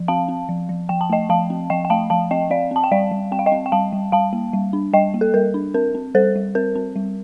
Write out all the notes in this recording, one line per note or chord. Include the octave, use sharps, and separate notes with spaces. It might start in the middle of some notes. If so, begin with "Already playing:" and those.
Already playing: F3
C4 F5 A5
C4
F3
F3
F3 G5
A5
A3 D#5 G5
F3 F5 A5
C4
F3 D#5 G5
G5
A3 F5 A5
F3 F5 A5
C4 D#5 G5
C4 D5 F5
C4 A5
G5
G3 D5 F5
G3
C4 G5
F5
D#5 G5
C4
G5
G3 F5 A5
G3
G3 F5 A5
A#3
G3
D4
G3 D#5 G5
A#3
A4
G3 A#4
D4
C4 A#4
C4
G3 A4 C5
G3
C4 A#4
C4
G3